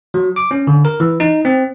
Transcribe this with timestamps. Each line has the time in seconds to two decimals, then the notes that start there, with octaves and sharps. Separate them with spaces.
0.14 F#3
0.36 D6
0.51 C#4
0.67 D3
0.85 A#4
1.00 E3
1.20 D#4
1.45 C4